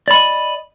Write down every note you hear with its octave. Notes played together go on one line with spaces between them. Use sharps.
D5 D#5 B5